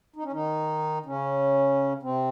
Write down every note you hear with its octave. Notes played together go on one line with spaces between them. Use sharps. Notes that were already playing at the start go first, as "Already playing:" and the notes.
D#4
C#4
D#3 D#4
C#3 C#4
C3 C4